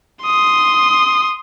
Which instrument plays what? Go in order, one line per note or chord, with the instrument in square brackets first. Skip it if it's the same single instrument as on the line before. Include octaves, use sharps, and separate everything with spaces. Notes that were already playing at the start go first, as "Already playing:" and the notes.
[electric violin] C6 D#6